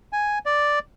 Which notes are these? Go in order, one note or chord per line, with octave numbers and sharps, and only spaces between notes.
G#5
D5